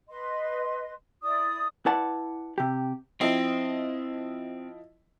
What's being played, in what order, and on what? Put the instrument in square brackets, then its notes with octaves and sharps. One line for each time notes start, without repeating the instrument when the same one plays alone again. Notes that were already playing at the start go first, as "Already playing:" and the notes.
[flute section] B4 D#5 C6
E4 D5 D#6
[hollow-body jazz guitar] E4 B4 D5 F#5 A5
C3 G4
[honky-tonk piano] F3 E4 D#5 [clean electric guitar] C4